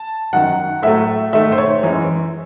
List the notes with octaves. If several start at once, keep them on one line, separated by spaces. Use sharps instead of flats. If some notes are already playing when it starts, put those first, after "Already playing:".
Already playing: A5
F#2 D#3 F#3 F#5
A2 F#3 A3 E5
G#2 D#3 A3 E5
C5
C#5
F#2 E3 G#3